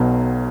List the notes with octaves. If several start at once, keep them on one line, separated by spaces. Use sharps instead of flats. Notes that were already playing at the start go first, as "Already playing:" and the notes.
Already playing: B1 B2 F#3